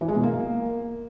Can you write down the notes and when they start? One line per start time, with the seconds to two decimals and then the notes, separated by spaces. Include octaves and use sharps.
0.01 E3
0.08 G#3
0.16 B2
0.23 A#3